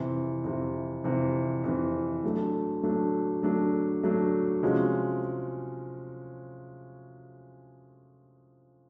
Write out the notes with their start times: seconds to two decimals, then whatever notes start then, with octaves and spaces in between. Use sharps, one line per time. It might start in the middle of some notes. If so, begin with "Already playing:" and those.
Already playing: F2 C3 E3
0.44 F2 C3 E3
1.04 F2 C3 E3
1.64 F2 C3 E3
2.24 F#3 A3 D4
2.83 F#3 A3 D4
3.43 F#3 A3 D4
4.03 F#3 A3 D4
4.63 C3 F3 G#3 C#4 F#4